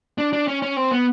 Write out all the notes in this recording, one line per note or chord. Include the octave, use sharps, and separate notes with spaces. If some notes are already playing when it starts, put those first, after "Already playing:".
D4
D4
C#4
C#4
C4
B3